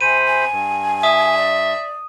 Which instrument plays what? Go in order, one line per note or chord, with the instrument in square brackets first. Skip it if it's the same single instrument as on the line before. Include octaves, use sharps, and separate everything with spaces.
[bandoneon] C3 C5 B5 [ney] G#5 [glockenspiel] D#7
[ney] G#5
[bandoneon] G2
[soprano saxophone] E5 [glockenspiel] D#6
[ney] D5